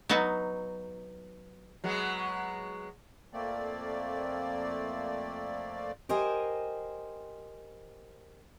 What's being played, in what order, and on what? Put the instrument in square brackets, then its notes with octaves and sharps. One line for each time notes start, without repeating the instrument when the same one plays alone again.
[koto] F#3 B3 D#4 F#4
[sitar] F#3 G#3 B3
[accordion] F2 A3 A#3 C4 D5
[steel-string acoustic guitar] G4 A#4 C5 D#5 G5 G#5